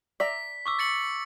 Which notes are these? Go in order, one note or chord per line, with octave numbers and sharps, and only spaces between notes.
D5 E5 A#5 B6
C#6 D6 E6
A6 C#7 F#7